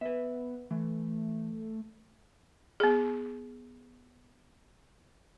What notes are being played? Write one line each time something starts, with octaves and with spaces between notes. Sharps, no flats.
B3 B4 E5
E3 A3
B3 G#4